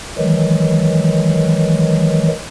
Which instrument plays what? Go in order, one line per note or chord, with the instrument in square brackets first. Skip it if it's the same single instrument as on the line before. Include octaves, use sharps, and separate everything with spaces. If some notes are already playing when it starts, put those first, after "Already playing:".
[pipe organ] D#3 E3 F#3 G#3